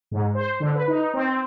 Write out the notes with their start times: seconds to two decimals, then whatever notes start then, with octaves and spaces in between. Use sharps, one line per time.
0.11 G#2
0.35 C5
0.60 D3
0.75 B4
0.88 D#4
1.14 C4